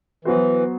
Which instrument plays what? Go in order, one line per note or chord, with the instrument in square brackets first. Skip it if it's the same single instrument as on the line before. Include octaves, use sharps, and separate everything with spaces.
[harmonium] E3 [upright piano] F#3 B3 F#4 C5